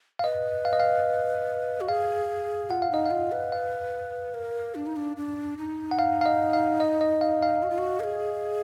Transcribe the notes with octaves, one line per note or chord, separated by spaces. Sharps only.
F5
B4 D#5
F5
D#5
F5
F#4
G#4 F5
F4 F#5
F5
D#4 D#5
F5
F4
B4
F5
A#4
D4
D#4
D4
D4
D#4
F#5
F5
F5
D#5
F5
D#5
D#5
F5
F5
F#4
F4
F#4
A#4
G#4